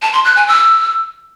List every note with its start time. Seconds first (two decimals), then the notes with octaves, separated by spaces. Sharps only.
0.02 A5
0.13 C6
0.25 F#6
0.36 G#5
0.48 E6